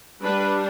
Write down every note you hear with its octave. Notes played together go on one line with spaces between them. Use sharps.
G3 D4 B4